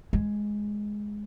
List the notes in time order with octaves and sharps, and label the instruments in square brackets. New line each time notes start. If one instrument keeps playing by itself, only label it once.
[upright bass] G#3